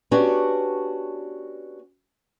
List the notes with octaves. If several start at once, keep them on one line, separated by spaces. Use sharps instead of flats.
B3 C#4 D4 F#4 G4